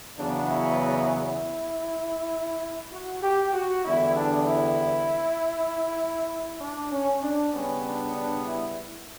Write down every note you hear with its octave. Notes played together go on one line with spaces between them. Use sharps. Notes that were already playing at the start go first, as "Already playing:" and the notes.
E2 C#3 F#3 B3 D4
E4
E4
F#4
G4
F#4
E2 D3 G3 B3 E4
D4
E4
D4
C#4
D4
C#3 G3 B3 C#4
D4
D4
E4